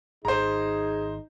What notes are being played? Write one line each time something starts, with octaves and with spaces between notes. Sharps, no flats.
G#1 D#4 G#4 C5 A#5